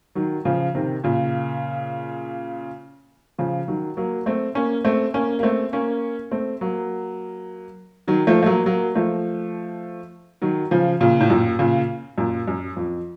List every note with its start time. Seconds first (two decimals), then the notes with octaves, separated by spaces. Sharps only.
0.15 D#3 F#3
0.45 C#3 F3
0.75 C3 D#3
1.04 A#2 C#3
3.38 C#3 F3
3.68 D#3 F#3
3.97 F#3 A#3
4.26 A3 C4
4.55 A#3 C#4
4.85 A3 C4
5.14 A#3 C#4
5.39 A#3
5.43 A3 C4
5.73 A#3 C#4
6.31 A3 C4
6.61 F#3 A#3
8.08 D#3 F#3
8.27 F3 A3
8.43 A3
8.46 F#3 A#3
8.66 F#3 A#3
8.95 F3 A3
10.42 D#3 F#3
10.71 C#3 F3
11.01 A#2 C#3
11.20 A2
11.30 F#2 A#2
11.59 A#2 C#3
12.18 F#2 A#2
12.48 F#2
12.77 F2